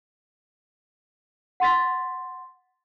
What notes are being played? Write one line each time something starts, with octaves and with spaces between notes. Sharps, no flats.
F#5 C6 A6 B6